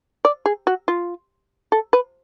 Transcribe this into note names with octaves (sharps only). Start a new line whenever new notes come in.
D5
G#4
F#4
F4
A4
B4